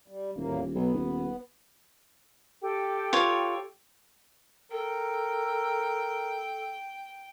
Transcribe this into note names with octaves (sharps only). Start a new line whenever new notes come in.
G3
D#1 E2 A2 A#3
B1 B3
D#1
G4 A4 G5
F4 C#5
A4 A#4 G5